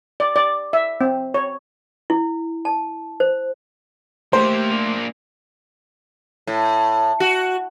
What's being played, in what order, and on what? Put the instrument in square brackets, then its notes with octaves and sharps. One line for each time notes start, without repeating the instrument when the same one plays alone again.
[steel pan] D5
D5
E5
C4
C#5
[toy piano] E4
A5
C5
[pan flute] A3 [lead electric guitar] A#3 G4 [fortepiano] C5
[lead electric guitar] A#3 D4
[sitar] A2
F#4